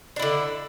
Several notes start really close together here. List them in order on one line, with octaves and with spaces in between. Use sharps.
D4 E4 D3